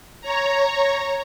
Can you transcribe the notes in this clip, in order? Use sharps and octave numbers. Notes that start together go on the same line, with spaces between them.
C#5 A#5